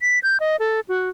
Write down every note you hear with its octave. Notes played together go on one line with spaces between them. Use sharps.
B6
G6
D#5
A4
F#4